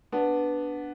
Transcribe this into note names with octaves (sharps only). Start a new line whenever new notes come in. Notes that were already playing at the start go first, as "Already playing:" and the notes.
B3 D4